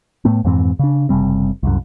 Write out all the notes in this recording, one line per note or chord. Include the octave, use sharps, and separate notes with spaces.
A2 A3 B3
F2 G#2 E3 C4
C#3 D4
F#1 C3 G3 C4
C2 F#2